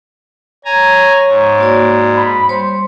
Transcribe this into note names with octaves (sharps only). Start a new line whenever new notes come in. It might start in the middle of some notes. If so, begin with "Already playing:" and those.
C#5 G#5 A#5
G#2
A#3 F#4 D5
B5
G3 C5 C#5 C6